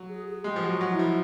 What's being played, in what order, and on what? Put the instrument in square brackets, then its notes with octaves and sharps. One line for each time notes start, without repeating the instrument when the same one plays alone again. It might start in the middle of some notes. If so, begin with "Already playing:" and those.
Already playing: [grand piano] F#3
[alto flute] G#4
G#4
[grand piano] G#3 [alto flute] G4
[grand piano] F3
F#3
[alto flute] F#4
[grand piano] F#3
[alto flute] E4
[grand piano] F3